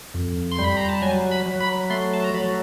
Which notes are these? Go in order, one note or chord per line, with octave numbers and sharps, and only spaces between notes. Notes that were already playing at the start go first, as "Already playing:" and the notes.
F2
C6
G3
B5
A#5
A5
F#3 G#5
B5
F#3
B5
A3 C6
A5
A#5
F#3 B5